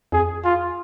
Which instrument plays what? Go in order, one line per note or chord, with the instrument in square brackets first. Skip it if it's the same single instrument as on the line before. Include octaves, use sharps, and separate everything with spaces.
[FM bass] F2 [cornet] G#4
[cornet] F4